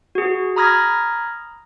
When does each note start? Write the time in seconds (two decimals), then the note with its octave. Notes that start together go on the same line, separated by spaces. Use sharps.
0.15 F#4 G#4
0.56 A#5 B5 D#6 F6 G#6 A#6